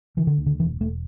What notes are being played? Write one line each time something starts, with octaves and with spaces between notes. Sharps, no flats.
D3 E3
D3
D2
D3
E1 E3
E1 A3